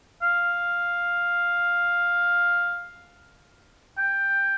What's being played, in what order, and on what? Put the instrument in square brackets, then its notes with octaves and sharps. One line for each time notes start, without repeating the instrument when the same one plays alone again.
[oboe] F5
G5